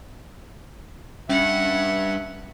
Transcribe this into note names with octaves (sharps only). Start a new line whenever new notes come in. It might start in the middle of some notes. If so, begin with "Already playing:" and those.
G2 C#4 E5 F#5